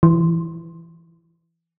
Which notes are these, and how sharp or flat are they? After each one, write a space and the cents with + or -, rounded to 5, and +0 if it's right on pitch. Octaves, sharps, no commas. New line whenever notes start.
E3 +15